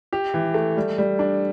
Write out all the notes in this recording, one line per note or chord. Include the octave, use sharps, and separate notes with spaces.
G4
E3
A3
G3
G3
D4